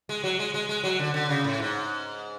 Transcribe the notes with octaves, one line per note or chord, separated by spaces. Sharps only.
G#3
F#3
G#3
G#3
G#3
F#3
D3
D3
C#3
A2
G#2